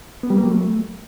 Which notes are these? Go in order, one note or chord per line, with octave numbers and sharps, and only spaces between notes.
B3
G3
A#3
F#3
A3